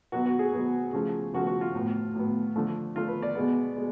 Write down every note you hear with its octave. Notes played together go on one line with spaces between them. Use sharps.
B2 F#3 B3 F#4
F#4
G#4
B2 F#3 B3
C#3 F3 A3
C#3 F3 A3 F#4
F#4
F4
A2 F#3 B3
A2 F#3 B3
D3 F3 A3
D3 F3 A3 F4
B4
D5
B2 G#3 B3
B2 G#3